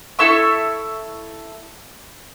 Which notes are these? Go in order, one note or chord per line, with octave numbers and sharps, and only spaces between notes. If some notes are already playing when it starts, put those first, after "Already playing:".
E4 A4 E5 C#6